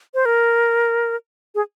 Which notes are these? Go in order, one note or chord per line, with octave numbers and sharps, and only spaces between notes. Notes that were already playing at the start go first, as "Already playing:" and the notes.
C5
A#4
G#4